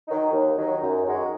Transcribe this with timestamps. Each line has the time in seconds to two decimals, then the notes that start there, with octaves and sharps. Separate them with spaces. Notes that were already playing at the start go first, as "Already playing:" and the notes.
0.08 D#3 F#3 D#4
0.32 D#2
0.57 D#3 F#3 D#4
0.82 F#2
1.06 D#3 G#3 F#4